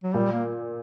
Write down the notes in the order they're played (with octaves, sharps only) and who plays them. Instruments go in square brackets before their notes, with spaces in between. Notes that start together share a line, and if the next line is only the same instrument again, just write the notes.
[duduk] F#3
[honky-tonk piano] A#2 [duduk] G3
[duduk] A#3